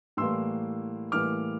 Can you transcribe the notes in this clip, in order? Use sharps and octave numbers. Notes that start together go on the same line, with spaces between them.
A2 E3 G3 A#3 C6 E6
A2 E3 G3 A#3 D6 F6